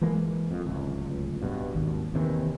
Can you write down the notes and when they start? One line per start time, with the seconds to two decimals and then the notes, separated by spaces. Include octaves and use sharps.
0.01 E3 G#3 A#3
0.51 F2
0.66 D1 C#2
1.41 G2 B2
1.74 G#1 D#2
2.14 D#2 C3 D#3 E3